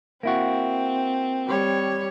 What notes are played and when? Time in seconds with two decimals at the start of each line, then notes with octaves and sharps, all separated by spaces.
0.23 A#3 C4 E4 F#4
1.47 G3 C#5